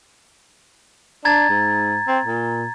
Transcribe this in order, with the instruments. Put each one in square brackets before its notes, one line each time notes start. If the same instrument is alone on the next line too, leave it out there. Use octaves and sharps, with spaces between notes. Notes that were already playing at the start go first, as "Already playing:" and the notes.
[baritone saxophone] D4 [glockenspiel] A#5 G#6 A6
[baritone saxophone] G#2
C4
A#2